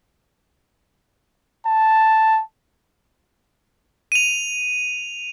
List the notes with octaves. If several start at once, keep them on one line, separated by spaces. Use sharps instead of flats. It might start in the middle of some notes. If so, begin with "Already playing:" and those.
A5
D#7 F7